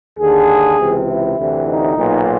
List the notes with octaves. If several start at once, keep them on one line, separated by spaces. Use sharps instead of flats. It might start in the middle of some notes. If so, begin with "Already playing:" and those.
D#2 D3 G#4
C#2 C3 E3
E4
D2 C3 E3
D#4
B1 A#2